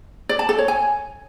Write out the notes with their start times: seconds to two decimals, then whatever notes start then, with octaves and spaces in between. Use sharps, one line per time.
0.29 D5
0.39 A5
0.49 A4
0.58 C#5
0.68 G#5